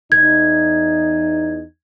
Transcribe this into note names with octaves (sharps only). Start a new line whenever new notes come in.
E2 D#4 G#6